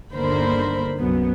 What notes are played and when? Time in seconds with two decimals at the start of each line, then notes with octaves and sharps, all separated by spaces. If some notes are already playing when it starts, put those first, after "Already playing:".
0.13 G1 D#2 D3 A#4 C5 B5
1.00 C2 F#2 F#3 B3